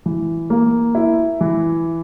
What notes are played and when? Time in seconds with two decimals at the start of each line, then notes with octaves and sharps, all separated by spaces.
0.06 E3
0.50 A#3
0.95 E4
1.41 E3